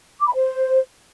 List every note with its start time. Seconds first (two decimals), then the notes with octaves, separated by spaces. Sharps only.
0.21 D6
0.27 B5
0.34 C5